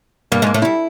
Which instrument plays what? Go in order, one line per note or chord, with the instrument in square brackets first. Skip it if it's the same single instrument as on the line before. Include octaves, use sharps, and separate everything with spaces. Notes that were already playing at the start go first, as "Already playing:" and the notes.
[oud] G2 G3 [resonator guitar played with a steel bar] A#3
[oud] G#2 G#3
[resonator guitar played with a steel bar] A#3
[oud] A2 A3
[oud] G3 [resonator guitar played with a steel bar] E4